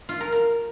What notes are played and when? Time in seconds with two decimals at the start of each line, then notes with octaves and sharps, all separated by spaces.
0.09 F4
0.21 A#4
0.32 A#4